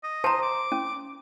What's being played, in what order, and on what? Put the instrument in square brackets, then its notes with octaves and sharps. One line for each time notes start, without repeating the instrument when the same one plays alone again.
[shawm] D#5
[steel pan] C5 [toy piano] A5 A#5
[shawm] D6
[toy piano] C#4